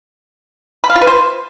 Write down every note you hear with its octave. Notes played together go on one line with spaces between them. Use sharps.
B5
F5
F4
B4
C5